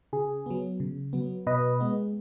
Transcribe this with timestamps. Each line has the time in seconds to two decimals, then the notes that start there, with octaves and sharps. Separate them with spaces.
0.13 C#3 G#4
0.46 F#3 B3
0.80 C#3
1.13 F#3 B3
1.47 B2 B4 D#5
1.80 G#3 B3